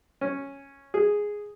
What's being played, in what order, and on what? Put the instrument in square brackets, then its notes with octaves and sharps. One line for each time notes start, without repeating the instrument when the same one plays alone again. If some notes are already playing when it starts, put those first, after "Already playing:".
[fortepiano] C#4
G#4